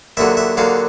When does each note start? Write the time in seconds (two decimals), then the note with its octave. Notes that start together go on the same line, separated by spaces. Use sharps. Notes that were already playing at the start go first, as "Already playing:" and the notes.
0.17 D#2 D3 F#3 E5
0.37 E5
0.57 D#2 D3 F#3 F5